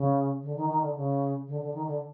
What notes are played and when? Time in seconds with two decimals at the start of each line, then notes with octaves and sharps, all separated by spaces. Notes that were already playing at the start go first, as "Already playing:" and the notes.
Already playing: C#3
0.43 D3
0.56 D#3
0.69 D#3
0.82 D3
0.96 C#3
1.48 D3
1.61 D3
1.74 D#3
1.87 D3